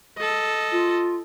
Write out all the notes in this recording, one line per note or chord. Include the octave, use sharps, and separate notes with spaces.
A4 D#5
F4